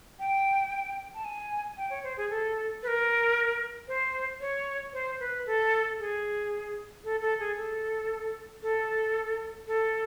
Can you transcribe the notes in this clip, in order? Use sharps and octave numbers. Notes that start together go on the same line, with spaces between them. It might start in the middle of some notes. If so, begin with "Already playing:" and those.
G5
A5
G#5
G5
C#5
C5
G#4
A4
B4
A#4
C5
C#5
C5
B4
A4
G#4
A4
A4
G#4
A4
A4
A4